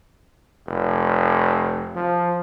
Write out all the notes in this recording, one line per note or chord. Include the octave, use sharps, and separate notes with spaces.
F1
F3